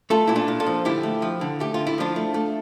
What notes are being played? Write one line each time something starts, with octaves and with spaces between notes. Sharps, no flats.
A3 F4 A4
A#2 E4
D4 F4
A#2
F4 A4
F3
D3 E4 G4
A3
F3
D3
A3 G4
D3 F4
E4
F3 D4 F4
A3
A3